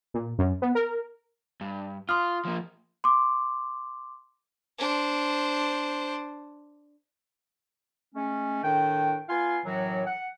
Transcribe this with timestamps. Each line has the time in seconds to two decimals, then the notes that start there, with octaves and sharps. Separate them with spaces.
0.14 A#2
0.39 F#2
0.62 B3
0.75 A#4
1.61 G2
2.09 F4 C6 D#6 F6
2.45 F3 A#3
3.04 C6 D6
4.79 D4 C5
8.15 G#3 A3 C#4
8.63 A2 D#3 D4 G5
9.29 B3 F4 F5 G#5 C6
9.65 F#2 A2 E3 F#3
10.06 F#5